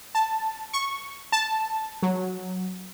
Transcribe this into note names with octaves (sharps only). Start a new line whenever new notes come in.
A5
C#6
A5
F#3